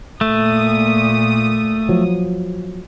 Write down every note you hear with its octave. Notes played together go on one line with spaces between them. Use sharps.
A#2 A3 D#6
F3 F#3